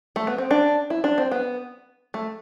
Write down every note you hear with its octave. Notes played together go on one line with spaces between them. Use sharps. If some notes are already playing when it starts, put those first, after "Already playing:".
A3
B3
C4
D4
E4
D4
C4
B3
A3